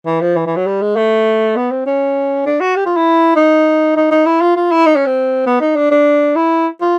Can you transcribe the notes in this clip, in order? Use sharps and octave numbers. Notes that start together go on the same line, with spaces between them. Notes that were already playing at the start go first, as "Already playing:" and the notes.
E3
F3
E3
E3
F#3
G3
G#3
A3
B3
C4
C#4
D4
F#4
G4
F4
E4
D#4
D#4
D#4
E4
F4
F4
E4
D#4
C#4
C4
B3
D#4
D4
D4
E4
F4